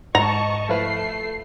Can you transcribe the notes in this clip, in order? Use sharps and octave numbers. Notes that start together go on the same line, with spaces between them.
G#2 G#3 D#5 A5 A#5 C#6
F3 A3 E4 B4 C7